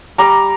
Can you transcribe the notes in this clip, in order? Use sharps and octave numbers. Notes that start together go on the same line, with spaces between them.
G3 A#5 D6